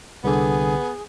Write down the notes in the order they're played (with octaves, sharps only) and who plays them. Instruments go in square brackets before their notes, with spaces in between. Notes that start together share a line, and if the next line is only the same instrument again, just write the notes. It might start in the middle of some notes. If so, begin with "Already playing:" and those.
[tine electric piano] C2 D3 [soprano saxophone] B3 [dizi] G#4